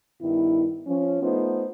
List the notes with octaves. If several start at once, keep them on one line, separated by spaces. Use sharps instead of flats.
G2 D#3 B3 E4
F3 C#4
A3 B3 D#4 F4 C5